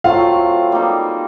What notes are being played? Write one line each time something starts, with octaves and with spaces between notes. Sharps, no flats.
F#3 A3 C4 E4 F4 F5
G3 A#3 D#4 G#4